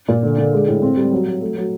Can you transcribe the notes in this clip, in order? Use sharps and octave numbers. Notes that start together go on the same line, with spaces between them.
A#2
D3
D3
G#3
A2
C4
G3
F#3
F#3
A3
F#3